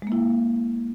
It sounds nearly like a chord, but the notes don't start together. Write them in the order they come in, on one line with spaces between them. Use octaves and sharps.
G#3 A#3 E4